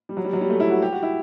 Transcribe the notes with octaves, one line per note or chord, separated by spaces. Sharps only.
G3
F#3
G3
F#3
G3
A3
E4
F#4
G4
F#4
E4